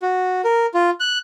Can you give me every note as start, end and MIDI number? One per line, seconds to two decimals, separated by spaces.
0.02 0.42 66
0.44 0.66 70
0.74 0.90 65
1.00 1.18 90